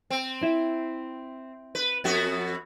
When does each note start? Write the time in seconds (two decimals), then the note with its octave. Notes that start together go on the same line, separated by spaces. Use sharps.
0.10 C4
0.43 E4
1.75 B4
2.04 F2 B3 F#4